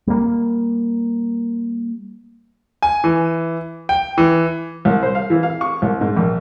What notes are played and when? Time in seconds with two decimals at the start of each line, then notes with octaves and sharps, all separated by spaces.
0.07 G3 A#3
2.82 G#5
3.04 E3
3.89 G5
4.18 E3
4.85 C2
5.03 C5
5.15 F5
5.30 E3
5.43 F5
5.61 C#6
5.82 C2
6.01 G#2
6.17 A#1